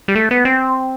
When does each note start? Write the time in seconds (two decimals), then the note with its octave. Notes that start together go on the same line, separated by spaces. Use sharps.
0.08 G3
0.15 A3
0.31 B3
0.45 C4